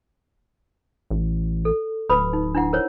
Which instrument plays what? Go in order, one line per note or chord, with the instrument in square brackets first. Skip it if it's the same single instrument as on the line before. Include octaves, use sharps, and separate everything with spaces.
[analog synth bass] A1
[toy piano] A4
[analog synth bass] D1 [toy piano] B4 B5 D#6
[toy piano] D#4
D4 E4 F#5
A#4 C5 C#5